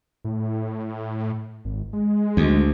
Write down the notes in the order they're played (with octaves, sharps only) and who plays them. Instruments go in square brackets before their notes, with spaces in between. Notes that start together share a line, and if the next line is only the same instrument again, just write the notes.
[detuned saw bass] A2
G#1
G#3
[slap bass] D2